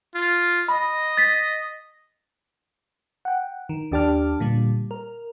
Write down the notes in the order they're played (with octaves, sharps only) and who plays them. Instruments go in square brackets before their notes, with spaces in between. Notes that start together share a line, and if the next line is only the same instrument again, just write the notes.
[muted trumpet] F4
[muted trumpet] D#5 [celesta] B5
[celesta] A6 B6
[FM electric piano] F#5 G5
D#3
D#2 D4 G4 D5 A5 F6
A#2 D3 G3
A#4